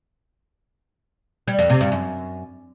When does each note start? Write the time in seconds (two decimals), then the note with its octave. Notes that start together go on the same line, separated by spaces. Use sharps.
1.48 G3
1.59 F2
1.70 C3
1.81 G2
1.92 F#2